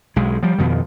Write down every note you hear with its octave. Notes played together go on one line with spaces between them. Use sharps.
B1 G#3
F3 G3
F2 B2 D#3